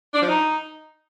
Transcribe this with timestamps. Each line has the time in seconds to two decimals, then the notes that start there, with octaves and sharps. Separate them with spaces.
0.13 D4
0.21 F3
0.28 D#4